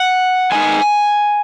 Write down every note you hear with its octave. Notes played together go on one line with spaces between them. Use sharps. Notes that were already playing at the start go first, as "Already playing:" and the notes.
Already playing: F#5
D#3 G#3 B3 D#4 G#5